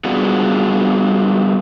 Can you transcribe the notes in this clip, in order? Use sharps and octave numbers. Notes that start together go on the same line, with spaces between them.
G3 B3 D4 F4 F#4 G#4